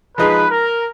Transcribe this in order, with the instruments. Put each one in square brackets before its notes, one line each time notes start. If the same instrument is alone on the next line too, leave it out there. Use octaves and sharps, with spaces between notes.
[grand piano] F3 G#3 D#4 G#4 [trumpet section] B4
[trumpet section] A#4